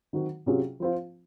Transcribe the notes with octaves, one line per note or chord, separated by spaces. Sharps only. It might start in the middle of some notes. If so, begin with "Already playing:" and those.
D#3 F#3 C4 F#4
C3 F#3 C#4 F4 G#4
F3 C4 F4